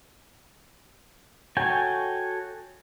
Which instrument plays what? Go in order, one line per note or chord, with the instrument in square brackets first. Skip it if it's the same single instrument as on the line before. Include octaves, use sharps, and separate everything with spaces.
[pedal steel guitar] F#4 A4 C#5 G5 G#5